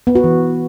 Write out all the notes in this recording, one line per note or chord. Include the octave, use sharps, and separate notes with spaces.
B3
F#4
E3